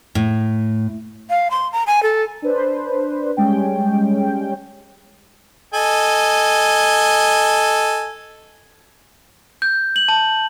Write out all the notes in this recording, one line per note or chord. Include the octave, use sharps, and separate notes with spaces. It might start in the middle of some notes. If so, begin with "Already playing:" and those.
A2
F5
C6
A#5
G#5
A4
D4 B4 C5
G3 G#3 C#4 G5
A4 D#5 G#5
G6
F#7
A5